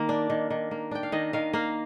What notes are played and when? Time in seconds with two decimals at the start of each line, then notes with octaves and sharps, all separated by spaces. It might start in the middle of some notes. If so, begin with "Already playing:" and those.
Already playing: D#3 A#3
0.09 D4
0.30 D#3
0.50 D#3
0.71 A#3
0.91 D4 G5
1.03 F5
1.12 D#3 D#5
1.33 D#3 F5
1.53 A#3 F5